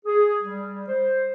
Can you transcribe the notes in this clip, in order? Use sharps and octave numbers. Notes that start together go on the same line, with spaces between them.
G#4
G3
C5